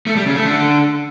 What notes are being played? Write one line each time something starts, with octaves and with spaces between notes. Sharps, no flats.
A3
G3
C#3
A3
D3